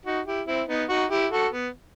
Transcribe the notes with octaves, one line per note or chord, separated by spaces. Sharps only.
D#4 F#4
E4 G4
C4 E4
B3 D#4
D#4 F#4
E4 G4
F#4 A4
B3